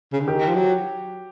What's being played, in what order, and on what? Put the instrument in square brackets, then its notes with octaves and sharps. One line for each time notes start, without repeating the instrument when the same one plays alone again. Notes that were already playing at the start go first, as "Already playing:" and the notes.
[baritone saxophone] C#3
D3
[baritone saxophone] D#3 [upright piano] G4
[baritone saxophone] F3
F#3